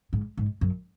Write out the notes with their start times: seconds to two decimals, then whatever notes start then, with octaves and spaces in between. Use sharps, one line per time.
0.13 G#2
0.37 G#2
0.61 F#2